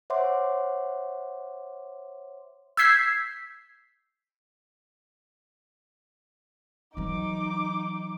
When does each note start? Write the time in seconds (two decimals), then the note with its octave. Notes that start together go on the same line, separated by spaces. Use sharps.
0.10 C5 C#5 E5 F#5 C6 D6
2.77 E6 G6 G#6 B6 C7
6.97 E3 F#3 D#4 D6